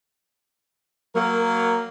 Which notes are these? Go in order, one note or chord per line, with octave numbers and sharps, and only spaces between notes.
F#3 A#3 A#4